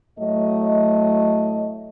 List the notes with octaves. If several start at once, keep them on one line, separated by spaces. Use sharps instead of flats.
A2 F#3 A3 D#5